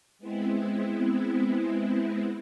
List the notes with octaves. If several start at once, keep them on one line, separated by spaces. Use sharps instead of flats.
G#3 B3 C4 E4